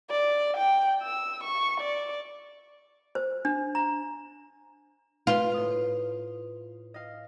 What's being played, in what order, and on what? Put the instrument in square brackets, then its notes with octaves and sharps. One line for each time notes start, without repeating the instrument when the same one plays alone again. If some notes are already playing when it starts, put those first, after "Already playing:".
[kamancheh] D5
G5
E6
C#6
D5
[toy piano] C5
D4
A#5
[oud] F4 [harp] B4 C5
[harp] A2 D#6
D#5 F5